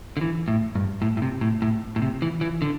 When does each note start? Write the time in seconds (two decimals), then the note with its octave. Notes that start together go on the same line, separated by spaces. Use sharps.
0.17 D3
0.21 E3
0.48 A2
0.75 G2
1.02 A2
1.17 A2
1.22 C3
1.41 A2
1.62 A2
1.96 A2
2.02 C3
2.22 E3
2.41 E3
2.62 D3